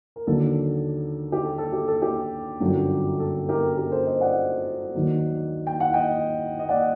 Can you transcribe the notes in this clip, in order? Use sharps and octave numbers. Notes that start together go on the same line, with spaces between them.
A#4
D#2 D3 F#3 A4
G4
A4
A4
G4
A4
G4
G1 F#2 D3 F#3
A4
G4 A#4
G4 A#4
A4 C5
C5 D#5
D5 F#5
D#2 D#3 F#3
G5
F#5
D#5 G5
D#5
D5 F#5